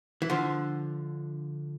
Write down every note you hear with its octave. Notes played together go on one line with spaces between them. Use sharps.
E3
D3 F3